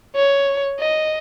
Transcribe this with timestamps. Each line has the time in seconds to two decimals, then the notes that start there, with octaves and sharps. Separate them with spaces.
0.15 C#5
0.80 D#5